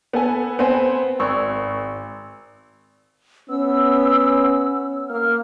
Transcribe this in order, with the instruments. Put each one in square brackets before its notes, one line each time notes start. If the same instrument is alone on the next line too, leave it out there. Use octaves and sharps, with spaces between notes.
[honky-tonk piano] B3 A4 G#5
B3 C4 G#5
G#1 C#6 E6
[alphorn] B3 [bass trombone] C#4 [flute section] E6
[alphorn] A#3 [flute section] F6